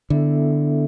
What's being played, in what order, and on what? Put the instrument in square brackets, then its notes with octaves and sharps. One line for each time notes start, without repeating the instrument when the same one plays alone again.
[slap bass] D3 [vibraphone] B3 E4 A4 E5